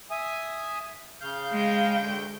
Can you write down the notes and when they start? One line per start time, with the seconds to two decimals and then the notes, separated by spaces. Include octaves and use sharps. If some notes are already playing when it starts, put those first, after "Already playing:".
0.11 E5 G#5 D#6
1.21 C#3 F5 G6
1.52 G#3 G5
1.97 D2 G6